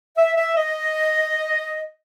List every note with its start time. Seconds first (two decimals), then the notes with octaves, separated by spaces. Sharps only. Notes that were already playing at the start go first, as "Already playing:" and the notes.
0.17 E5
0.37 E5
0.56 D#5